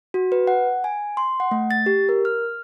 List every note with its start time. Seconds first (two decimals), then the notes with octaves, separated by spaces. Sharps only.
0.14 F#4
0.32 B4
0.47 F#5
0.84 G#5
1.17 C6
1.40 F#5
1.51 A3
1.71 A6
1.86 G4
2.09 A#4
2.25 F6